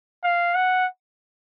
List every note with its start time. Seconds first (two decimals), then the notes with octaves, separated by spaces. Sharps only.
0.24 F5
0.55 F#5